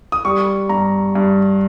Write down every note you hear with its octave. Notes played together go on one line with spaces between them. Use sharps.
D#6
G3 C#6
G2 A#5
G2